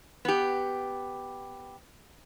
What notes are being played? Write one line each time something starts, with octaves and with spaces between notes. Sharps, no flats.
B3 G4